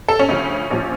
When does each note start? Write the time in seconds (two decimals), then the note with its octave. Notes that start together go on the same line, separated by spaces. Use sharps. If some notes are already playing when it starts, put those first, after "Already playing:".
0.08 A4
0.19 C#4
0.29 D2 C#3 F3
0.71 A#1 A#2 F3